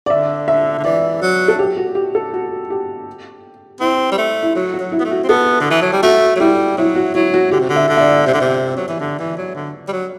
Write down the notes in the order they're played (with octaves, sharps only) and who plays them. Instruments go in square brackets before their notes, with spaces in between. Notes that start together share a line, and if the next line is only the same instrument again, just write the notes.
[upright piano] D5
[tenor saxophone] D3 [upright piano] E5
[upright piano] E5
[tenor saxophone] D3
[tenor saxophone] E3 [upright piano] D5
[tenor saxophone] F#3
[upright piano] A4
G4
F#4
G4
A4
F#4
G4
[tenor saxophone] C4 [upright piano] E4
[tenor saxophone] G3
A3
[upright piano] E4
[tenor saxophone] F#3 [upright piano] F#4
[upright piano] F#4
[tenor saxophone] F#3
[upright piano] E4
[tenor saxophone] B3
A3
[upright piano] F#4
[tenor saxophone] C4
[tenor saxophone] B3 [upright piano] A4
[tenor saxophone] D3
E3
F#3
G3
[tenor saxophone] A3 [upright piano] F#4
[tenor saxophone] F#3
[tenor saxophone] G3 [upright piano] E4
[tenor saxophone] F#3 [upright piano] E4
[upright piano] F#4
[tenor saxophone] F#3 [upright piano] E4
[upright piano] F#4
[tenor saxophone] D3 [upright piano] G4
[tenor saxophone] C3
D3
[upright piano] E5
[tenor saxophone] D3
[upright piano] E5
D5
[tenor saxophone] C3
D3
C3
F#3
E3
D3
E3
F#3
D3
G3
F#3